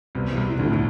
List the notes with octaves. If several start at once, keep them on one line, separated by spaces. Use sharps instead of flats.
C2 C3 B3
E3
C2 C3
E4
D2 D3
A2
B2